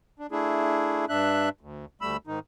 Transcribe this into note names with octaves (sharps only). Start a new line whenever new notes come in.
D4
A3 D4 E4 G#4
G2 D4 E5 F#6
D2
D2 G3 A3 B5 E6
G#2 D#3 D#4